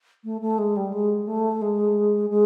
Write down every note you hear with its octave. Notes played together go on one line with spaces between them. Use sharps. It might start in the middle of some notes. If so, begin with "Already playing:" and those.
A3
A3
G#3
G3
G#3
A3
G#3
G#3